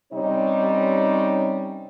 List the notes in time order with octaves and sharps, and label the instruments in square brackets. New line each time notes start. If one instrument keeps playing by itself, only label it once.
[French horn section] C3 G3 C#4 D#4 C#5